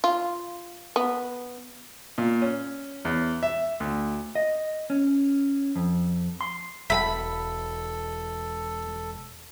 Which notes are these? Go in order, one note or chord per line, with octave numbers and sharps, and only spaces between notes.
F4
B3
A#2
C#4
E2
E5
D2
D#5
C#4
F2
C6
E1 A4 E5 F#5 G5 B5